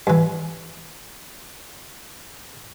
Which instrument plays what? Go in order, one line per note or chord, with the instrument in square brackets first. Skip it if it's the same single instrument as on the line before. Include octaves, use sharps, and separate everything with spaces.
[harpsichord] G2 E3